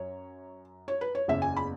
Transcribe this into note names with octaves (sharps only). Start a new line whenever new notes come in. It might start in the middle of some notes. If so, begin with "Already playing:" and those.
Already playing: F#2 F#3 C#5
C#5
B4
C#5
F#1 E2 C#3 E5
G#5
B5